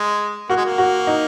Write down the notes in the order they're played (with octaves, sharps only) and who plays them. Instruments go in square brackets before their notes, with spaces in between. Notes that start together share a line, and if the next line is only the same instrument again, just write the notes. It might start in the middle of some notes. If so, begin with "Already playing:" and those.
Already playing: [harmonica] G#3
[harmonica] A#3 [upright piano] F#4
[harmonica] G#3
A#3
[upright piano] F#4
D#4